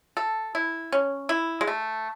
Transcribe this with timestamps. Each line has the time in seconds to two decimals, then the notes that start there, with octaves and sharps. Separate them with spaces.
0.17 A4
0.55 E4
0.92 C#4
1.29 E4
1.61 G#3
1.68 A3